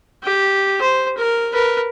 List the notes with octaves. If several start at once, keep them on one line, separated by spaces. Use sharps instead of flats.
G4
C5
A#4
A#4 B4